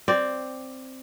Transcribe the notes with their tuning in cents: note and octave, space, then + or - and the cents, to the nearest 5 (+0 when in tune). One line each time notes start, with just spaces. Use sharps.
C4 +0 D5 +0